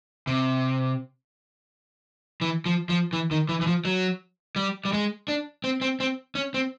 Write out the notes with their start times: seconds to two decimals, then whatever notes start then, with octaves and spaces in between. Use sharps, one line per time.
0.27 C3
2.41 E3
2.66 F3
2.89 F3
3.13 E3
3.31 D#3
3.49 E3
3.61 E3
3.67 F3
3.85 F#3
4.56 G3
4.85 G3
4.93 G#3
5.28 D4
5.64 C4
5.81 C4
6.00 C4
6.35 C#4
6.54 C4